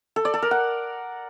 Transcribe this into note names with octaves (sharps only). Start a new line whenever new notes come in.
A4
D5
A4
A#4
F#5